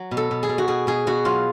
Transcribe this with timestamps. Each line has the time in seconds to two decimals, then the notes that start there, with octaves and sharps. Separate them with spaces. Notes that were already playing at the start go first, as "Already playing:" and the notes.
Already playing: F#3
0.11 B2
0.17 A4
0.31 B2
0.43 G#4
0.49 B2
0.58 F#4
0.68 B2 G#4
0.87 B2 G#4
1.07 B2 F#4
1.25 F#3 F4